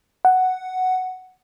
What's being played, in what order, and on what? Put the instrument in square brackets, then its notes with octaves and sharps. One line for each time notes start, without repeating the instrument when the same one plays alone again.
[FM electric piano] F#5